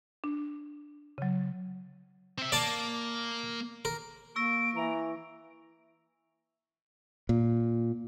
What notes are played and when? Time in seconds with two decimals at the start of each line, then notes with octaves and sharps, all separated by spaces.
0.24 D4
1.18 C#3 F#3
2.38 C4 E5
2.52 A#3 D5 A5
3.85 A#4
4.36 A#3 C#6 E6 A#6 D7
4.76 E3 A#5
7.29 A#2